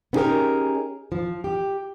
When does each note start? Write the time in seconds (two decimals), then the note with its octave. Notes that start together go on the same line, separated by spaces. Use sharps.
0.13 B3 C#4 D#4 G4 G#4 A#4
1.12 F3
1.44 G4